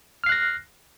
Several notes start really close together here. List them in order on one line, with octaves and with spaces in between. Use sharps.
F6 C7 F#6 A#6